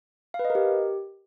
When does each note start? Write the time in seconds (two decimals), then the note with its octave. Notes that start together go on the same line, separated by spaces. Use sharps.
0.34 F5
0.39 B4
0.45 D#5
0.50 A#4
0.55 G4